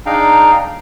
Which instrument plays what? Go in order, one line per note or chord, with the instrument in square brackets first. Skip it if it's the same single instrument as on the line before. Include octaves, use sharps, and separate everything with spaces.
[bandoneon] D4 D#4 G#4 F5 G5 A#5